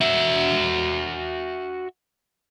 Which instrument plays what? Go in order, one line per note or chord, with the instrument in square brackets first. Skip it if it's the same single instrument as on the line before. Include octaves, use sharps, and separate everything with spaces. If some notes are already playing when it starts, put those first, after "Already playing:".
[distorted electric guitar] F#4 E5